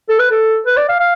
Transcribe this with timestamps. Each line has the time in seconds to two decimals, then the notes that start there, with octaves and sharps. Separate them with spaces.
0.09 A4
0.19 B4
0.31 A4
0.66 B4
0.77 D5
0.89 F5
0.99 F5